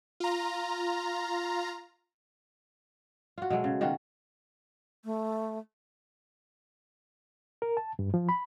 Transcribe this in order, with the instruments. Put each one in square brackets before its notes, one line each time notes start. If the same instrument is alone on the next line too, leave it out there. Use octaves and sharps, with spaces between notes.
[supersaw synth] F4 A#5
[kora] F4 F#4
B2 F#3 G#3 A3
C#3
B2 D#3 F4 F#4
[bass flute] A3
[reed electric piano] A#4
A5
G2
F3
B5